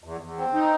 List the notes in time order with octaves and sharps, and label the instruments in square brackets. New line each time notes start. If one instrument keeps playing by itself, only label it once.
[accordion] E2
E2
C4
D#4